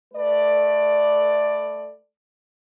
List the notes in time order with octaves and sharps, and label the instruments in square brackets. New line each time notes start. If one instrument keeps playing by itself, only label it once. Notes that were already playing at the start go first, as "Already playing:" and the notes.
[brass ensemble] A3 B4 D5